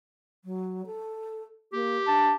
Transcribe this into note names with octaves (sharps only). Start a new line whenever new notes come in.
F#3
A4
A#3 G4
D4 A5